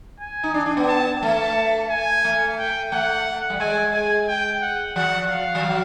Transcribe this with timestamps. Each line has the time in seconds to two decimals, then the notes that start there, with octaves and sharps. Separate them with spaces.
0.20 G#5
0.43 D#4
0.54 D4
0.66 D4
0.77 B3
0.88 A5
1.22 A3 A5
1.90 G#5
2.24 A3
2.59 G5
2.92 A3 F#5
3.50 G3
3.60 G#3 G#5
3.93 G#5
4.28 G5
4.62 F#5
4.96 F3 F#5
5.30 F5
5.55 F3
5.64 F#3